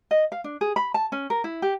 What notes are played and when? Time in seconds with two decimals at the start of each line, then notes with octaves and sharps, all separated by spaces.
0.11 D#5
0.32 F5
0.44 D4
0.61 G#4
0.76 B5
0.94 A5
1.12 C#4
1.30 A#4
1.44 E4
1.62 G4